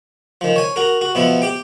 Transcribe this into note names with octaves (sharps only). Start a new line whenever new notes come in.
D#3 F3
C#5 G#5
F#4 A#4
F#4
B2 F3 B3 E4
G4 G5